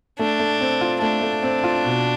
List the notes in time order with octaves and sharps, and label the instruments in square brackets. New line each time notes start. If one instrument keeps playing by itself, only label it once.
[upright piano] A3 [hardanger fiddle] D4
[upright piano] A3
C4
F4
[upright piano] A3 [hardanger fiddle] D4
[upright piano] A3
C4
F4
B2